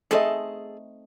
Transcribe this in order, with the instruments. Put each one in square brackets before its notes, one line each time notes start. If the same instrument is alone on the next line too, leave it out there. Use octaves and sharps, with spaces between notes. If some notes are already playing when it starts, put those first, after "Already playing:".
[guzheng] A3 C4 D#4 [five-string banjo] G#4 A4 D#5